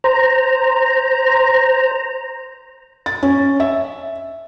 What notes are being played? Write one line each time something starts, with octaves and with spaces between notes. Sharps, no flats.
C5 A#5
A6
C#4
E5